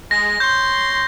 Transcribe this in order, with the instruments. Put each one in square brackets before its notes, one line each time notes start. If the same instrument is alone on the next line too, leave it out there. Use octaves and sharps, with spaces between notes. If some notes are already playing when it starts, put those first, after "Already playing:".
[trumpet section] G#3 [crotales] A#6
[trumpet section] C#5 C6 [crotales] G6